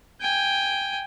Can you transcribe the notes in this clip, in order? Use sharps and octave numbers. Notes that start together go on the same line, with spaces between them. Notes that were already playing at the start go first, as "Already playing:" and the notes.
G5 G#5